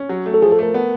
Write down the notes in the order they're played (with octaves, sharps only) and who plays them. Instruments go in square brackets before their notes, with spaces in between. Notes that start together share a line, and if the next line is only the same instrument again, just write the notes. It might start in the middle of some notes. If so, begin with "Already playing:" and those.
Already playing: [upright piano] C#4
F#3
A3
[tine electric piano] A4
[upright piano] F3 [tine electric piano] G#4
[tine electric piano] A4
[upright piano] A3 [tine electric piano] A#4
[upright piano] B3